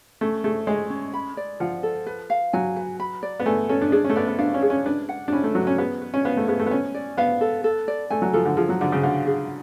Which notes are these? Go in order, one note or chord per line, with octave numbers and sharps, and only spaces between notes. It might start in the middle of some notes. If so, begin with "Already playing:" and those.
A3 C#4
A3 G#4
G#3 C#5
C#4
B5
D5
F3 F#5
A4
B4
F5
F#3 G#5
B4
B5
D5
B3
A3 G#5
C#4 A4
D4
D4 G#4
C#4
A3
B3 D5
B3
D4 F5
C#4
G#4
C#4
D4 B4
F#5
D4
C#4 B5
A3
F#3 B4
C#4
B3 G#4
B4
C#4
B3 F5
A3
B3 G#4
A3
B3
C#4 G#5
D5
B3 F5
A4
A4
D5
A3 G#5
F#3
F3 A4
D3
F3 G#4
F#3
D3 D5
C#3
D3 F5
G#4